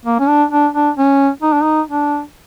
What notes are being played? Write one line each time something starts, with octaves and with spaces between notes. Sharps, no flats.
A#3
C#4
D4
D4
D4
C#4
D#4
D4
D#4
D4